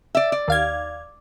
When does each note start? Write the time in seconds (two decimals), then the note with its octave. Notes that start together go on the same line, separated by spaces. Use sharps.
0.15 D5 E5
0.32 D5
0.48 D#2 F5 G#6